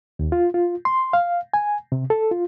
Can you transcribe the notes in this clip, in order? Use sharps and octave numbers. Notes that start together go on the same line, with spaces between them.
D#2
F4
F4
C6
F5
G#5
C3
A4
F4